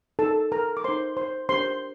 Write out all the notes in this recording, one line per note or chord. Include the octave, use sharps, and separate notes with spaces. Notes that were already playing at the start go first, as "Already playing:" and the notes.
D#4 A4 A#4 A5
A#4 A#5
D6
D#4 A#4 C5 C6
C5 C6
D4 G4 A#4 C5 C6